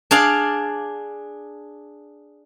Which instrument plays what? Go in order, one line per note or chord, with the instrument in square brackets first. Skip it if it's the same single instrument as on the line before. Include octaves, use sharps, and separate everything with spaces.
[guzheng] D4 G#4 D5 F5